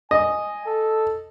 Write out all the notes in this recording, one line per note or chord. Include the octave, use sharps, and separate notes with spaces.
D#5 G#5
A4